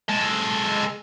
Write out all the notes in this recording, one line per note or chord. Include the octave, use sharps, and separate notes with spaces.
G#3 A4